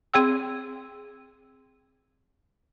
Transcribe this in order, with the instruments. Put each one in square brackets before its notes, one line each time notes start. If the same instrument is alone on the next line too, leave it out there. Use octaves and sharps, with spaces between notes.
[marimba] C4 G#4 G5 E6